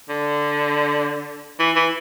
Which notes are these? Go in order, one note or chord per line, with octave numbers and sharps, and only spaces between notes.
D3
E3
E3